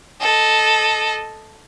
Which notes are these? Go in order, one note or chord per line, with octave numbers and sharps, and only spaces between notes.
A4 D#5